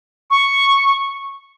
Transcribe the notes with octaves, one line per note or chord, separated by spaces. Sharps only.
C#6